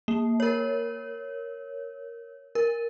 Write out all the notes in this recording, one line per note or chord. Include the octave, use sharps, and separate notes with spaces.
A#3
A#4 C#5
A#4